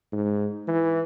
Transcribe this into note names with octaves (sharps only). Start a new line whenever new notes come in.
G#2
E3